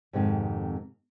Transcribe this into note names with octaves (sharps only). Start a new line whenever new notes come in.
F2 G#2 C3 D#3